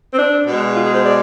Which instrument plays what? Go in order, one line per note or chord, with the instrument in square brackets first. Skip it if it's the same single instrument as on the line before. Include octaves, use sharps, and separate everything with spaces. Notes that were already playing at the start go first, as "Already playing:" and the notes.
[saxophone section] C4
D4
B2 G#3
F4
G#4
C5
D5